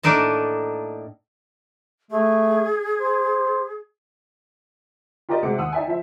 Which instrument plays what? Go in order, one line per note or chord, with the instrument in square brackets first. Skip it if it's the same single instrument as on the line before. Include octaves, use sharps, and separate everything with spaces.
[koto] A2 A#3 D4 D#4 A4
[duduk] A3 [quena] G#4
[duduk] C5
[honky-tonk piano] F4 G4 A#4 D5 D#5
C3 G#3 F#4 G#4 D6 C#7
D#2 F#5 D#6 E6
D#4 D5 E5 G5 G#5
F3 E5